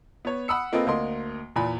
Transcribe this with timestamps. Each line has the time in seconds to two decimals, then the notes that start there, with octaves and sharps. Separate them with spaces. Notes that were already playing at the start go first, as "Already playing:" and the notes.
0.25 B3 C#5
0.48 F#5 B5 D#6 E6 C#7
0.73 A#3 C4 F4 A4 B4 D#5
0.86 D2 A#3 D#5 C6
1.56 E2 A#2 G#5 B5